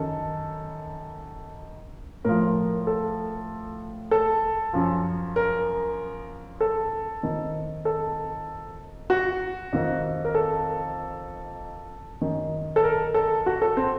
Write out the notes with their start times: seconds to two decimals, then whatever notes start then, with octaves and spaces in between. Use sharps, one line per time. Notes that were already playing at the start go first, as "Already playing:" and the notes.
Already playing: F#2 D#3 A4
2.25 A2 F3 A#4
2.87 A4
4.11 A4
4.73 F#2 F3
5.36 A#4
6.61 A4
7.23 F2 D#3
7.85 A4
9.10 F#4
9.73 F2 D#3
10.25 A#4
10.35 A4
12.21 F#2 D#3
12.76 A4
12.84 A#4
13.14 A4
13.46 F#4
13.62 A4
13.77 C4